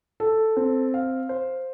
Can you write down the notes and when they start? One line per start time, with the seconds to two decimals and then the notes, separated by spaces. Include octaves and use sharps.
0.20 A4
0.57 C4
0.94 F5
1.29 C5